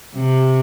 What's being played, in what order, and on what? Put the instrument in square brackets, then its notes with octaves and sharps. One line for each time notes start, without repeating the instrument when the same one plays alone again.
[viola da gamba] C3